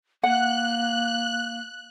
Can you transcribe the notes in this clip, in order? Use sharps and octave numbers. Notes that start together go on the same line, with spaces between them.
A#3 F#5 F#6